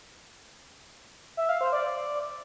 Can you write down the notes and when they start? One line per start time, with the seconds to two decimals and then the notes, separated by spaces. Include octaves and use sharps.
1.37 E5
1.49 F5
1.61 C5
1.73 D5